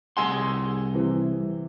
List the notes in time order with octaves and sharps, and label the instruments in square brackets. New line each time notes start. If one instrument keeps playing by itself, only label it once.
[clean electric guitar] C2 G#4 C6 [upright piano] F#5 G#5 E6
[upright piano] C3 E3